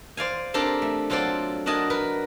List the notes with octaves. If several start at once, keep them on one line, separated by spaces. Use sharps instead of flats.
C5 D5 F5 G#5
C4 D4 G4 A4 A#4
A3
F#3 F4 A4 C5 D5 F#5
D4 F#4 A#4 D#5 G#5 A5
A#4 B4